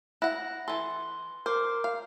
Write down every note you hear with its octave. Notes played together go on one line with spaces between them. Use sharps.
E4 F#5 F#6 A#6
E3 A4 C6
A#4 C5 D6
F5